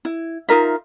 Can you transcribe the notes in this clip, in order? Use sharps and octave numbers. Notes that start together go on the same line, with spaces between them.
E4
D#4 F4 A#4 E5